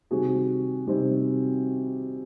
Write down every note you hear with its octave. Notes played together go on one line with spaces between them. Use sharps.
C3 D#3 G3 C4 F#4 G#4
C3 D#3 G3 C4